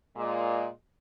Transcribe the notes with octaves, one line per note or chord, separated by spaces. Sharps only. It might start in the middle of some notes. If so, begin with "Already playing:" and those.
A#2 G#3